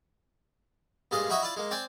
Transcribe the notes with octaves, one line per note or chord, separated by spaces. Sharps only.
G2 A#2 G#3 D#5 F5
D#4 E4 F#4 D#5 E5
E4 F4 D5
G#3 A#3
C4 D5 G5 G#5